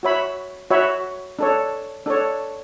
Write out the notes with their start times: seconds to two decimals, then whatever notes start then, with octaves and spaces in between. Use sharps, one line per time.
0.03 F#4 C#5 E5 B5
0.70 F#4 C#5 E5 B5
1.39 D4 A4 C#5
2.06 D4 A4 C#5